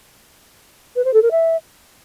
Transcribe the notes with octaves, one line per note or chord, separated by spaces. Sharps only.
B4
C5
A4
A#4
E5